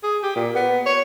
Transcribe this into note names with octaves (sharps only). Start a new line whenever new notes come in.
G#4
G4
A#2
B3
C#5